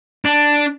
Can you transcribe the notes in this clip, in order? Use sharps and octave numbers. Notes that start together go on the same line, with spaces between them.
D4